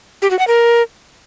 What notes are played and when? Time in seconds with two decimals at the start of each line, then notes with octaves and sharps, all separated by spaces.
0.22 G4
0.31 F#4
0.39 F#5
0.47 A#4